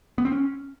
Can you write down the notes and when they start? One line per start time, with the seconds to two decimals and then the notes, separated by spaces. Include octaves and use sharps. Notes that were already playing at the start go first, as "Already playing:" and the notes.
0.18 B3
0.25 C4
0.32 C#4